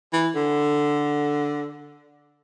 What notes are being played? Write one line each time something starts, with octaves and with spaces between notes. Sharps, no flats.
E3
D3